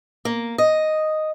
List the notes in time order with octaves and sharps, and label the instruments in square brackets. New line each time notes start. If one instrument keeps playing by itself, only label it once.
[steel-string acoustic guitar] A#3
D#5